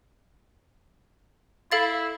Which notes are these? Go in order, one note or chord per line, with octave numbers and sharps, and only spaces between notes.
E4 A4 F5 A6